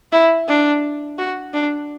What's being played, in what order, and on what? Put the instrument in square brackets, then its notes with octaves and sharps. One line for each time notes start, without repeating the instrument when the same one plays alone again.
[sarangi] E4
D4
F#4
D4